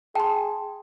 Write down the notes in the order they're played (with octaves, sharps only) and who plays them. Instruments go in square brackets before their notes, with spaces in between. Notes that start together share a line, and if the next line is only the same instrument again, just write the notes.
[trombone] G#4 [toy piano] G5 [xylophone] A5 C6